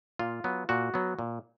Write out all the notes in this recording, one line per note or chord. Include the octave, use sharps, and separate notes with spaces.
A#2 F4
F#3 B3
A#2 F#4
F#3 B3
A#2